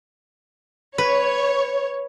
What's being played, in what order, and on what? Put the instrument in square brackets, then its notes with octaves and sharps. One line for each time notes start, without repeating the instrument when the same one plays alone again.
[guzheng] B4 [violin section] C#5